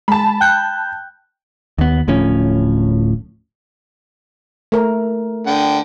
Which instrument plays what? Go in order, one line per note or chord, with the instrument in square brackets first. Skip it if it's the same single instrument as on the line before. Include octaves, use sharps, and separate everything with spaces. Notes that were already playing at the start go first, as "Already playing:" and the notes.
[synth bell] G#3 [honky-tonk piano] A5 B5
[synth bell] G5 F#6 G6
[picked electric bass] D#2 B3
D1 A2 F3 C#4
[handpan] A3 A#4
[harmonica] D3 G5